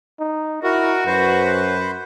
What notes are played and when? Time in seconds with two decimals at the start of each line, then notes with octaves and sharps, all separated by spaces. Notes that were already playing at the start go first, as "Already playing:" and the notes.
0.20 D#4
0.63 E4 F#4 A#4
1.06 F#2 B4 C5